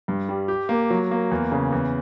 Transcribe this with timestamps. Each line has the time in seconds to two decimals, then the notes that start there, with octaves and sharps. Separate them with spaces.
0.08 G2
0.29 G3
0.48 G4
0.69 A#3
0.90 F#3
1.11 A#3
1.31 E2
1.52 C#3
1.72 E2